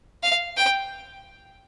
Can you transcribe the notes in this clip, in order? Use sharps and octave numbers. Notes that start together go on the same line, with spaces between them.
F5
G5